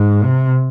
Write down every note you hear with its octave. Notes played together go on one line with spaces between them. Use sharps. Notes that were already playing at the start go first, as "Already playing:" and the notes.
Already playing: G#2
C3